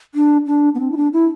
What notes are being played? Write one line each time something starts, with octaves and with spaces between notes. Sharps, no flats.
D4
D4
B3
C4
E4
D4
E4